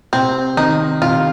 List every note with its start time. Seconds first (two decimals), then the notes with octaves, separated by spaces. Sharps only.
0.13 C3 C4
0.57 D#3 C4 D#4
1.02 C3 F4